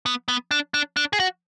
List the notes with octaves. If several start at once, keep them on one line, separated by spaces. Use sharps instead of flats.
B3
B3
D4
D4
D4
G#4
F#4